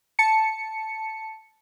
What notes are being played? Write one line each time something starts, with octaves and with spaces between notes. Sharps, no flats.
A5 C#7